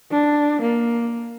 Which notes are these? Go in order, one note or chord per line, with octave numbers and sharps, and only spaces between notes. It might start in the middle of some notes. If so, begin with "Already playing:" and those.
D4
A#3